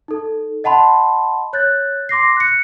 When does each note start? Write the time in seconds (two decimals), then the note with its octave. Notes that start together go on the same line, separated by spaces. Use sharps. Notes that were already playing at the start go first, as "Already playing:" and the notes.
0.08 D#4 A4
0.64 D#5 F#5 A5 B5 C6
1.53 C#5 F#6 G6 A6
2.09 C6 D6 A#6 C7
2.37 F#6 C#7